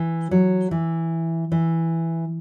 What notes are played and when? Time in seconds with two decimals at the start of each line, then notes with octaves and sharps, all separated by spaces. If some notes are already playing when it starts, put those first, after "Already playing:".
Already playing: E3
0.31 F#3
0.71 E3
1.52 E3